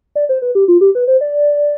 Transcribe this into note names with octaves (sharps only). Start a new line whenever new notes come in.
D5
C5
B4
G4
F4
G4
B4
C5
D5